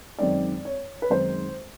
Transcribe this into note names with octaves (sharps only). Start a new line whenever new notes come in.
F#2 D#3 G#3 C4 D#4 D5
C#5
B4
F#2 D#3 G#3 C4 D#4 C5